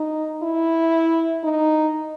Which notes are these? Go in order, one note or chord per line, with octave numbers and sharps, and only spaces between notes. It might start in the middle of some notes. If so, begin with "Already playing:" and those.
Already playing: D#4
E4
D#4